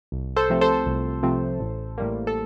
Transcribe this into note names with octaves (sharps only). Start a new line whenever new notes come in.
C2
A4 C5
C3 F3 A3 C4
A4 C5
C2
C3 F3 A3 C4
A1
A2 G3 A#3
A4